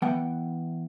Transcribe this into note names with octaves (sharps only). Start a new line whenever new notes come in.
E3 B3 F#5 G5